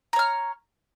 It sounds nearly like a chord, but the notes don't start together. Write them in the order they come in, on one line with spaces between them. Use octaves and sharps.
A#5 C#5 F6